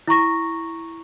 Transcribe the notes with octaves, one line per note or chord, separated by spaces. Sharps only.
E4 A#5 C#6 A#6